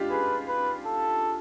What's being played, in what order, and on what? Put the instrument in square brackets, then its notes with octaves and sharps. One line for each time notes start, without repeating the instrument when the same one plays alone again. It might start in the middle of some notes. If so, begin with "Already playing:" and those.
Already playing: [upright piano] D4 D#4 F4 G4
[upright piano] G#4 [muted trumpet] B4
[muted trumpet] B4
A4